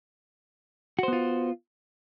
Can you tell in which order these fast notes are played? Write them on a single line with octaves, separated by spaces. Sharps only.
F#4 C5 B3 F4